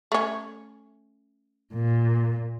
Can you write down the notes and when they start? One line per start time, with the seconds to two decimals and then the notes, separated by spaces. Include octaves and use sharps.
0.12 A3 C#4
1.74 A#2